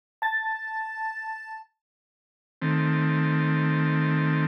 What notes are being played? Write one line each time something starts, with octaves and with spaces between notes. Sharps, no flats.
A5 A6
D#3 A3 C4